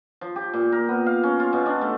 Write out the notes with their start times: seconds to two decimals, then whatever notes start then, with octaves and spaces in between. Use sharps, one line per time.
0.21 F3
0.36 G4
0.53 A#2
0.72 A#4
0.89 B3
1.06 F5
1.23 C#4
1.40 F4
1.53 B2
1.66 D4
1.81 A3